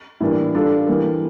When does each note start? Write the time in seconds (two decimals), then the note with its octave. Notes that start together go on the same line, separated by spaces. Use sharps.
0.20 A2 E3 G3 A#3 D4
0.55 G3 D4 F4 A4
0.88 E3 G3 A#3